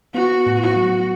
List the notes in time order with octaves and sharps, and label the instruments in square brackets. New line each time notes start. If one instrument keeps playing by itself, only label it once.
[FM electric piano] B3 [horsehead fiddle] F#4
[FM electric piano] A2
[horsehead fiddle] F#4
[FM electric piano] F#3